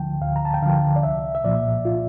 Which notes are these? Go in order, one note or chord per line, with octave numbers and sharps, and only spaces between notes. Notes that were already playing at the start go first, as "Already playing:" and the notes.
Already playing: D2 D3 F3 G5 A5
D2 F5
A#5
A5
G5
D3 F3 F5
D5
C2 E5
E5
A#2 F3 D5
F4